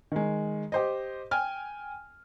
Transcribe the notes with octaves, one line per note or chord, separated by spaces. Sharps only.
D#3 G#3
G4 C5 D#5
G5 G#5 F6